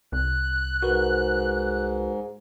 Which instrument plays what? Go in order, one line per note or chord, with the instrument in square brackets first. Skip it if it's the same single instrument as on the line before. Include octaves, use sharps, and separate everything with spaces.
[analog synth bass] C2 [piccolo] F#6
[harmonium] G#2 [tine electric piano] F#4 A#4 B4